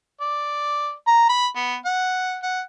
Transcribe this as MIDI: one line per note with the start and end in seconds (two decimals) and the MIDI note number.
0.21 0.92 74
1.07 1.25 82
1.29 1.47 83
1.56 1.75 59
1.85 2.36 78
2.43 2.61 78